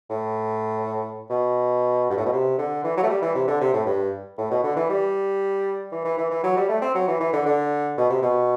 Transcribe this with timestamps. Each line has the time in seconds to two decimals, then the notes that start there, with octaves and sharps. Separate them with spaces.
0.10 A2
1.30 B2
2.10 G2
2.18 A2
2.25 B2
2.33 C3
2.58 D3
2.84 E3
2.97 F#3
3.03 A3
3.10 G3
3.22 E3
3.35 C3
3.48 D3
3.61 C3
3.74 A2
3.86 G2
4.38 A2
4.51 B2
4.64 D3
4.77 E3
4.90 G3
5.92 E3
6.05 E3
6.18 E3
6.31 E3
6.44 F#3
6.57 G3
6.69 A3
6.82 C4
6.95 F#3
7.08 E3
7.20 E3
7.33 D3
7.46 D3
7.98 B2
8.10 C3
8.22 B2